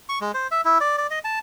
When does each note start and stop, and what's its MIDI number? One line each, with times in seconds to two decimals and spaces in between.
0.09 0.19 85
0.21 0.32 56
0.34 0.47 72
0.51 0.61 76
0.65 0.78 64
0.81 0.97 74
0.98 1.07 74
1.11 1.19 75
1.24 1.39 81